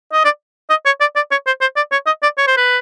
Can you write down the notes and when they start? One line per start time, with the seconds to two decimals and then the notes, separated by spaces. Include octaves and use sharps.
0.12 D#5
0.24 D5
0.70 D#5
0.86 C#5
1.00 D5
1.16 D5
1.31 C#5
1.46 C5
1.61 C5
1.76 D5
1.92 C#5
2.06 D#5
2.23 D5
2.38 C#5
2.47 C5
2.57 B4